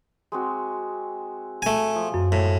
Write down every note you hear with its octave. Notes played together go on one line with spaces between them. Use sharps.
G#3 C4 F#4
A3 G#5
F3
F#2
A2